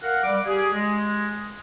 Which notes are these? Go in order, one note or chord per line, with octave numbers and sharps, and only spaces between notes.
A#4 F5 F#5
G3 D6
G4 G#4
G#3